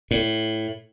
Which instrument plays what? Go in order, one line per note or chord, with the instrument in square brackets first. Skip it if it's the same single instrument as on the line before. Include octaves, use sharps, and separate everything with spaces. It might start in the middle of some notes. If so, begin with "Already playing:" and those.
[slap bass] A2